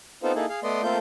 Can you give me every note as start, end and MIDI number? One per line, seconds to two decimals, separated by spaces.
0.23 0.32 59
0.23 0.32 60
0.23 0.32 63
0.23 0.32 65
0.23 0.32 69
0.23 0.32 72
0.35 0.46 58
0.35 0.46 63
0.35 0.46 64
0.35 0.46 68
0.35 0.46 69
0.49 0.60 68
0.49 0.60 77
0.63 0.82 57
0.63 0.82 59
0.63 0.82 74
0.63 0.82 75
0.63 0.82 84
0.83 0.98 57
0.83 0.98 58
0.83 0.98 60
0.83 0.98 65
0.83 0.98 69
0.83 0.98 91